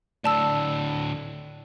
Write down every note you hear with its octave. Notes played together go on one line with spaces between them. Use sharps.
D2 A2 D5 A5 E6